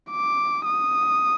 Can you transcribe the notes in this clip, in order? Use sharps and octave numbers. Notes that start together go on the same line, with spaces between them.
D6
D#6